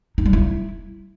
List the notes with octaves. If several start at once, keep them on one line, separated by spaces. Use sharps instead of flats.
D#4
G3
E4